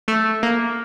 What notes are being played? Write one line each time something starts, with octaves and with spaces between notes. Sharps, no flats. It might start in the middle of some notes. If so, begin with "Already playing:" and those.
A3
A#3